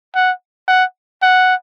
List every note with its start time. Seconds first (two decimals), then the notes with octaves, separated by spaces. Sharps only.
0.15 F#5
0.68 F#5
1.22 F#5